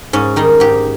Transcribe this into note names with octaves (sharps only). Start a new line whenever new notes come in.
G#2 C#4
D#3 G3 D#4
G#2 G4